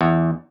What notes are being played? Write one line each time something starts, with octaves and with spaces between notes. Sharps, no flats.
E2